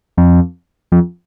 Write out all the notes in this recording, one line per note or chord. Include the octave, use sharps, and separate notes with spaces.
F2
F2